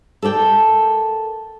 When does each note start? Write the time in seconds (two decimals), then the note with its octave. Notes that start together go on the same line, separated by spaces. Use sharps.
0.22 A4 A#4 D5 G5 A5